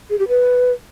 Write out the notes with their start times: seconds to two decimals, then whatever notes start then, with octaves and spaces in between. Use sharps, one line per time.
0.10 G#4
0.19 G4
0.28 B4